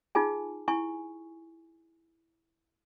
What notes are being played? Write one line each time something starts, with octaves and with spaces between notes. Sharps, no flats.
D#4 F4 G#4 G#5
E4 G#5 C#6